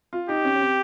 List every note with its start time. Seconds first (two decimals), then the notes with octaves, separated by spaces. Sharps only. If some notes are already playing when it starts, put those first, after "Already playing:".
0.13 F4
0.29 D#4 G4
0.45 C#4
0.55 C#4
0.61 C4